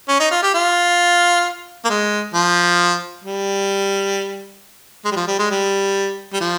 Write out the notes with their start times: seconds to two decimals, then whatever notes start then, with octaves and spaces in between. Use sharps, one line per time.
0.08 C#4
0.20 D#4
0.31 F4
0.42 G4
0.54 F4
1.85 A#3
1.89 G#3
2.34 F3
3.24 G3
5.05 G#3
5.12 G3
5.16 F3
5.27 G3
5.39 G#3
5.51 G3
6.33 G3
6.41 F3